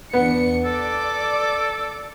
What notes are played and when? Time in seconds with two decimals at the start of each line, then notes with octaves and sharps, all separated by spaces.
0.13 E2 B3 D4 C#7
0.65 A4 D5 D6